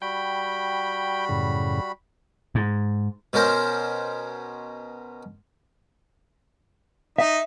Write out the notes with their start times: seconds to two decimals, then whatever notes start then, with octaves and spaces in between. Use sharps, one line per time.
0.02 G3 F#4 G5 B5
1.29 F#2 A2 C#3
2.55 G#2
3.33 B2 C#4 A#4 C5
7.18 D#4 E5